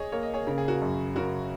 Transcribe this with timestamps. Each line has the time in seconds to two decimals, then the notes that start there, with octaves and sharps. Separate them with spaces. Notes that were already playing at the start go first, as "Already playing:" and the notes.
Already playing: G#4 C#5 D#5
0.12 A#3 C#5
0.23 D#5
0.34 G#4 C#5
0.47 C#3 A#4
0.58 G#4
0.68 F#4 A#4
0.82 F#2
1.16 C#3 F#4 A#4